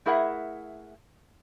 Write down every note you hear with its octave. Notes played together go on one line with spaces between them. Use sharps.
A3 E4 G#4 A#4 E5 F#5